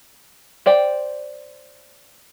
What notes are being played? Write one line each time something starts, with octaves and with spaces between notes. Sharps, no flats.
C5 D5 G5